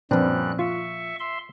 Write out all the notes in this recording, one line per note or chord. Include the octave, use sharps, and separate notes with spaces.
F#2 A#2 F3 G3 C4 D4 B4 F#6
F4 E5 C#6
E5 C6